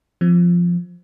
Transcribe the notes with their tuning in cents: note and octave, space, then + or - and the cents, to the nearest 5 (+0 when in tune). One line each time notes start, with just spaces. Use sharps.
F3 +0 C4 +0